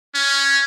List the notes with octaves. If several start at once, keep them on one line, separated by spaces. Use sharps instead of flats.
C#4